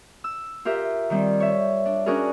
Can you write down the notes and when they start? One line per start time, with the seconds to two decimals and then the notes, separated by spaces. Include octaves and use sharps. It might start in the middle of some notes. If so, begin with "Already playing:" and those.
0.24 E6
0.65 F4 G4 A#4 E5
1.10 D#3 G3 C4
1.40 C#5 E5
1.86 D4
2.06 C#4 D4 F#4 G#4 A#4